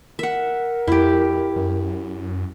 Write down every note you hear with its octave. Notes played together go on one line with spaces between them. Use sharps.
A#4 E5 F#5
F2 E4 G4
F#2